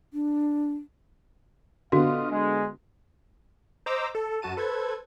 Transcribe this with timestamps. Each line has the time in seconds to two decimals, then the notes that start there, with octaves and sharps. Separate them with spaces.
0.13 D4
1.92 D3 B3 F4 F#4 D#5 F5
2.30 G#3
3.86 C5 D#5 A#5 D6 E6
4.15 A4
4.42 F#2 F#4 A5 D#7
4.57 A4 B4 C5 G#6